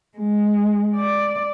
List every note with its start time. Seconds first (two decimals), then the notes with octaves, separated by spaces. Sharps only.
0.17 G#3
0.96 D5